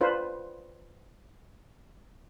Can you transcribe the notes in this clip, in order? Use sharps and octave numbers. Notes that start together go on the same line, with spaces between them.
D4 F4 B4 C5